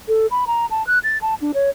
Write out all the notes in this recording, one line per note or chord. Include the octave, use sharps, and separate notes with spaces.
A4
B5
A#5
A5
F#6
A6
A5
D4
C#5